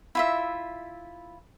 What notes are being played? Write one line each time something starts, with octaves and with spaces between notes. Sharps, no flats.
E4 F4 E5